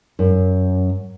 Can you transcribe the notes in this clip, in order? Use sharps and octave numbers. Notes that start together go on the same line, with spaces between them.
F#2